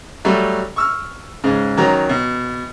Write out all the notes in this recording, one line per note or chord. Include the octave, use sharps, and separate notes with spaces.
F#3 G3 A3
C#6 E6 F6
G#2 C#3
D#3 F#3 C#4 A#5
B2